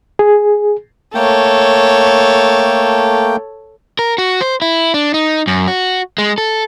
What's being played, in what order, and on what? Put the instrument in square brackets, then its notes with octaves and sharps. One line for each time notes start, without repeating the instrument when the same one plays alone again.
[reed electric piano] G#4
[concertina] A3 A#3 G5 [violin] A4 C#5
[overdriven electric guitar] A#4
F#4
C5
E4
D4
D#4
F#2
F#4
G#3
A4